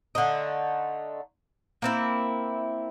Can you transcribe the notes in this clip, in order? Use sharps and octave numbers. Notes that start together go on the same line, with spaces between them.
D3 A3 D#4
A#3 C4 E4